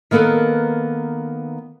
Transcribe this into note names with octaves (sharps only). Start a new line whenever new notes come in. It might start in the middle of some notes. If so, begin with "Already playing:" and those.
D#3 A#3 B3 A4 B4